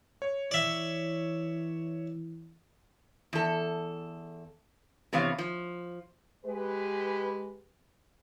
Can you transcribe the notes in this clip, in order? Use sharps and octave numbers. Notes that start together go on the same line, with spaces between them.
C#5
E3 D5 E5
E2 A4
C3 E3 B3 C#5 F5
F3
G#3 G4 B4